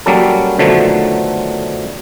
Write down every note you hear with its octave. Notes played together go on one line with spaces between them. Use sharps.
F#3 G3 A#3 C#4 A4
B2 D3 D#3 F3 F#3 A3